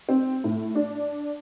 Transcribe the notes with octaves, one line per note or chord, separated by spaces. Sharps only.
C4
A2
D4